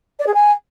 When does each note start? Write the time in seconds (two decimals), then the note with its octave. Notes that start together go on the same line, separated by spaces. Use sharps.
0.19 D5
0.27 G#4
0.34 G#5